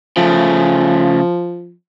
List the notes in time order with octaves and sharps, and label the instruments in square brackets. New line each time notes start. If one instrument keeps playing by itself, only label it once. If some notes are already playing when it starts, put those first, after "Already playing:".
[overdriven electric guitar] C#3 A3 [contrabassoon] F3